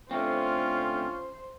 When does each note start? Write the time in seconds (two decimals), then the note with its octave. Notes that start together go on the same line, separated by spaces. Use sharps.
0.11 D3 A3 C4 C#4 F4 C5